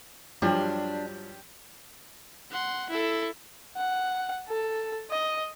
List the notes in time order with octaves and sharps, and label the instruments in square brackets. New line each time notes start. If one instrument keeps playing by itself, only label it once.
[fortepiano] G2 F3 F#3 [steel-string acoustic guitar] D4 [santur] G4
[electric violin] F#5 C6
E4 A4
[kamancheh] F#5
A4
D#5